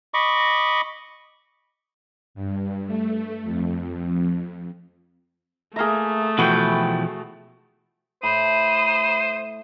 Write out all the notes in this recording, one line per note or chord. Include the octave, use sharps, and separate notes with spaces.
D#5 B5 C#6 D6
G2
A3
F2
A3 A#3 G#4 E5 A#5
B2 E3 F3 F#4 B4 G5
A2 C5 B5 D#6